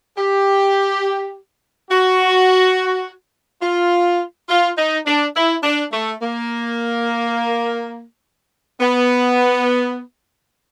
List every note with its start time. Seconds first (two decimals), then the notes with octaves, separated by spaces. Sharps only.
0.17 G4
1.90 F#4
3.61 F4
4.49 F4
4.77 D#4
5.06 D4
5.35 E4
5.63 D4
5.92 A3
6.21 A#3
8.80 B3